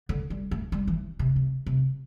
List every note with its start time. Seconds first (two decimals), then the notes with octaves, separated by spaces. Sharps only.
0.09 D3
0.30 G3
0.51 A3
0.72 G3
0.87 E3
1.19 C3
1.36 C3
1.66 C3